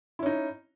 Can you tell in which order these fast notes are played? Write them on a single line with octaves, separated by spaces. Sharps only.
E4 C#4 D#4